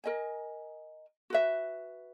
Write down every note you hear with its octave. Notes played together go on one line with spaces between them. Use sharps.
A#4 D#5 G#5
F#4 B4 E5